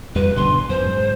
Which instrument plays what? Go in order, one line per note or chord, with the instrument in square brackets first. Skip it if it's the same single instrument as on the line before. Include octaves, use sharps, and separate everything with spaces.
[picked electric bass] F2 G3 [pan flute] B4
[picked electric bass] G#1 B2 D3 [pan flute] C6
[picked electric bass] F#2 [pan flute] C5
[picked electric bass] G#2